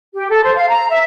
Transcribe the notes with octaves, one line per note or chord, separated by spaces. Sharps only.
G4
A4
C5
F5
A#5
E5